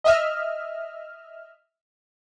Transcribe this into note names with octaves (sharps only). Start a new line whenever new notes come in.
D#5 E5 F6